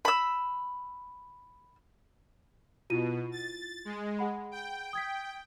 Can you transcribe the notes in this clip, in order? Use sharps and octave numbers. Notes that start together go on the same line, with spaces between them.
B5 E6
B2 E4 F4 D#7
A6
G#3
G#4 F#5 B5
G5
D#6 G#6 B6